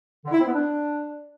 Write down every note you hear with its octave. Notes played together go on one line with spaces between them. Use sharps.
D3
E4
C4
B3
D4